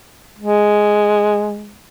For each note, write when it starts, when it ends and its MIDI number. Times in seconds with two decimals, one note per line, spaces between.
0.39 1.77 56